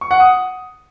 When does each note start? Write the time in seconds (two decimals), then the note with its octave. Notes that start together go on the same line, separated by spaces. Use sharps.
0.01 C#6
0.11 F#5
0.20 D#6